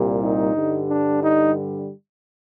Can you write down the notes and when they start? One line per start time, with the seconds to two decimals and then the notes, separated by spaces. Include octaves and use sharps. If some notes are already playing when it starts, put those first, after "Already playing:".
Already playing: C2 A#2 G3
0.21 D#4
0.55 G2 D3 G3
0.89 D4
1.22 D#4